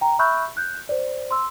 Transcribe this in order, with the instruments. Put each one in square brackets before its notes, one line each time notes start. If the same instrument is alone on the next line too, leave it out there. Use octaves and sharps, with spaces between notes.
[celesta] G5 A#5
E5 B5 C#6 E6 F#6 G6
F#6 G6
C5 D5
C6 E6